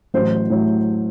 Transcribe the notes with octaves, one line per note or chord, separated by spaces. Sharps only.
A1 A2 F#3 C5
A2 F#3